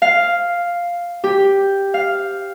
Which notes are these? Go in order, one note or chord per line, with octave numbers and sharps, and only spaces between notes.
F5
G4
F5